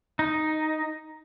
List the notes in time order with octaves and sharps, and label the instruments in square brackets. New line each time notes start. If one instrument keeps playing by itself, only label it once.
[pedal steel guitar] D#4